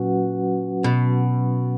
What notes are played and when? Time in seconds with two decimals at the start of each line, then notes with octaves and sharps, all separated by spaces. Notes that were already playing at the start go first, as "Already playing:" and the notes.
Already playing: A#2 F#3 C#4 F#4 B4 F#5
0.84 B2